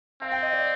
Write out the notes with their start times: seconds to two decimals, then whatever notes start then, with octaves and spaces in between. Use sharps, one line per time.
0.21 C4 F5
0.32 G5
0.43 D#5
0.53 D5